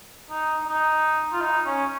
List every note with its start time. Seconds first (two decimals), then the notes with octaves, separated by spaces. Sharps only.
0.30 D#4
0.67 D#4
1.32 F4
1.41 D#4
1.66 C#4